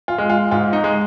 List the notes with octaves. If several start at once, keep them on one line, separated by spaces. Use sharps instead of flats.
F4
G#3
F4
G#2 F4
D#4
G#3